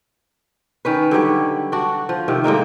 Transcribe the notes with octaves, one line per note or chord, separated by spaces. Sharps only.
D#3 C#4 B4
D3 F#3 G3 C#5
D4 F#4
F3
C3 D#3
G#2 D3 A#3 D#4